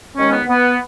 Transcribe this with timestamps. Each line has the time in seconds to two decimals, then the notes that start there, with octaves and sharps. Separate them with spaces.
0.17 D#2 D#3 G#3 C#4
0.31 B3
0.47 B3